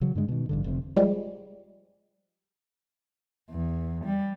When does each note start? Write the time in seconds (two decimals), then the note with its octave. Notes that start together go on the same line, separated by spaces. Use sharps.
0.01 C#3 E3 F#3
0.15 G2 D3 G#3
0.28 B2 D#3
0.49 A1 G2 D3
0.64 F1 F2 C3
0.96 F3 G3 G#3
3.51 E2
4.05 G3